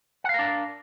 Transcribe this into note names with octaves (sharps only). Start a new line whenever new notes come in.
D4 A#4 F5 F#5